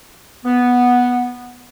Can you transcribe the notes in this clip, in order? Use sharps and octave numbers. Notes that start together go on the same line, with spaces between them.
B3